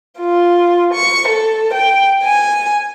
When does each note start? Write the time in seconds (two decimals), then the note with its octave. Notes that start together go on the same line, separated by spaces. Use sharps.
0.19 F4
0.92 C#6
1.28 A4
1.73 G5
2.23 G#5